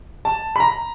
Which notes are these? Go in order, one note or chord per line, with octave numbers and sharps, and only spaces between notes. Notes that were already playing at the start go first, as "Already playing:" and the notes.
A5
B5
A#5